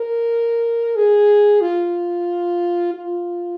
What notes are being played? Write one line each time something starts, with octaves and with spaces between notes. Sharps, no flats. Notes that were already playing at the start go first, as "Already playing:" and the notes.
Already playing: A#4
G#4
F4
F4